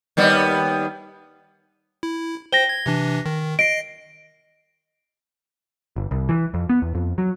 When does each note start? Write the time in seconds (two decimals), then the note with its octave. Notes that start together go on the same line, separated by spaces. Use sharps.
0.17 D#2 G3 B3
2.03 E4
2.52 C5 G5 A#6 G7
2.69 G#6
2.86 C3 E3 D4
3.26 D#3
3.59 D#5 A#6 C7 D7
5.96 G1
6.11 C2
6.29 E3
6.54 F2
6.69 B3
6.82 E2
6.95 F2
7.18 F#3